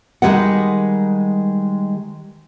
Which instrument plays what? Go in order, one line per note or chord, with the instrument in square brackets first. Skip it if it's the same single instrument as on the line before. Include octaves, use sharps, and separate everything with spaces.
[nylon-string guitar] D#3 G3 G#3 B4 F#5